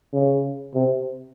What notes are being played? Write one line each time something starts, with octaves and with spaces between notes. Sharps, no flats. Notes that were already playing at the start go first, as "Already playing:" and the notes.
C#3
C3